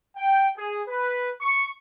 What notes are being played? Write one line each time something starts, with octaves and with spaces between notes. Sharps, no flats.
G5
G#4
B4
C#6